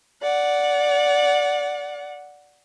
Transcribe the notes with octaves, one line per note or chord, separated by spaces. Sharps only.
D5 F#5